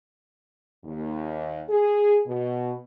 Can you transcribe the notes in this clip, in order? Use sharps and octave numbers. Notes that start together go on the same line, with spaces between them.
D#2
G#4
B2